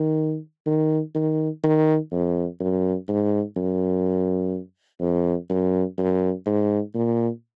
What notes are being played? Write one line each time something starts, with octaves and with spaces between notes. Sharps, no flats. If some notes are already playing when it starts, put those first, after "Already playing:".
Already playing: D#3
D#3
D#3
D#3
F2
F#2
G#2
F#2
F2
F#2
F#2
G#2
A#2